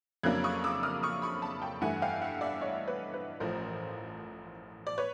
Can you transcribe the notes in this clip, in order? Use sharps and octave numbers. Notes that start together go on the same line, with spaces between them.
F2 C#3 F#3 A#3 D4 F#6 G#6
C#6 D#6
D6 E6
D#6 F6
C#6 D#6
B5 C#6
A5 B5
G5 A5
G2 E3 A3 F#5 G#5
F5 G5
E5 F#5
D5 E5
C#5 D#5
B4 C#5
B4
A1 A2 F3 A#4 C5
D5
B4 C#5